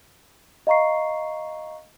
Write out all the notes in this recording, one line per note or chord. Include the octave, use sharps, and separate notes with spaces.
D#5 F5 A#5 C#6 C7